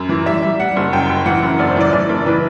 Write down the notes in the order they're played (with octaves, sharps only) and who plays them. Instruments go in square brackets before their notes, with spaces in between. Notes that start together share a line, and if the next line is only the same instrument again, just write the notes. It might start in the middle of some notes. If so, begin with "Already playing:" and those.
Already playing: [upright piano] F#2
E3
G3 E5
G3
G3 F#5
F#1
F#2 G5
F#1
E3 F#5
F#2
F#1 D5
C5
E3 D5
E3 D5
F#1
E3 B4